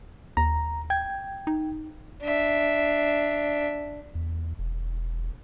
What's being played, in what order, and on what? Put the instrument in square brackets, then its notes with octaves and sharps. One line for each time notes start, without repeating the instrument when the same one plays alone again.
[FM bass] D#2 [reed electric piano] A#5
[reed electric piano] G5 G#6
[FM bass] D#4
[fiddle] D4 E5
[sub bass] E2
E1